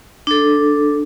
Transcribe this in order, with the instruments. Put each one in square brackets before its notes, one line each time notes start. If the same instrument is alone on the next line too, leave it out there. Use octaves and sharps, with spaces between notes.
[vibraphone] D4 A4